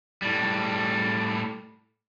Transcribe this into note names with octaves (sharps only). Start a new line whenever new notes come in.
A2 G3